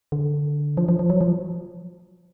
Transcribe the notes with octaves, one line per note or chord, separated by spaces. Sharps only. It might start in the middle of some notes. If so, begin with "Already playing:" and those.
D3
F3
F3
F3
F#3
F3